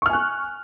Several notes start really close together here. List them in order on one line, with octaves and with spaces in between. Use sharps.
C#6 F6 G#5 F#6